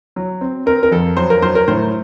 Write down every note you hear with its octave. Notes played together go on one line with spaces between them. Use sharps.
F#3
C4
C4 A#4
A#4
F2 A4
F#3 C5
A#4
F#3 C5
A#4
A2 C5